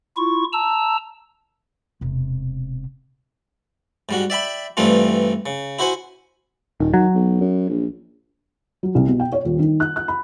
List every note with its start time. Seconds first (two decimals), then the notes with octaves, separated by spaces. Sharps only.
0.17 E4 F4 C#6
0.53 A5 A#5 E6
2.01 E1 C3
4.09 G#2 G3 F#4
4.30 D5 E5 G5 B5
4.77 G2 E3 G3 A3 C4 F4
5.46 C#3
5.79 E4 F#4 C5 F#5 G#5
6.80 D#1 D#3
6.94 D#3 F#3
7.14 B1
7.41 F#2
7.69 A#1
8.83 F#3
8.95 C2
9.07 B2
9.20 G5
9.32 C#5
9.45 D#1
9.59 D#3
9.80 F#6
9.96 F#6
10.08 B5